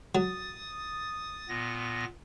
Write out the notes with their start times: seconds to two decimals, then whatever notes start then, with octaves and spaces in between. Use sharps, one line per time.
0.15 F#3 D#6 A6
1.49 A#2 B3 A#6